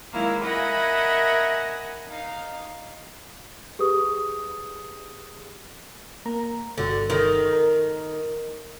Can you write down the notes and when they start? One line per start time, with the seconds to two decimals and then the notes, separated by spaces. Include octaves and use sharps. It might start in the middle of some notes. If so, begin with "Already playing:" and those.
0.13 D#3 F#3 G#3 A#3 E4
0.43 A#4 D#5 E5 F#5 G#5 B5
2.07 D#4 F5
3.79 G4 G#4 B4 D#6
6.26 A#3 A#5
6.78 G1 G2 D3 F#4
7.10 D#3
7.53 A#4